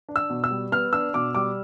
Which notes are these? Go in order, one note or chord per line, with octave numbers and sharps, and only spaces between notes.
D4
E6
B2
E6
G3
B3 F6
D4 E6
B2 D6
G3 D6